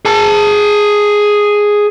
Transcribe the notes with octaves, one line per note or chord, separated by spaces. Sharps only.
G#4 A5